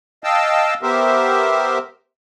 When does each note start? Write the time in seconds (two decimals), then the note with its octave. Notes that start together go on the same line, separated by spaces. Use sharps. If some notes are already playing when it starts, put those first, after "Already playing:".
0.24 D#5 F5 G5 A5 E6
0.82 B3 G4 A#4 C5 E5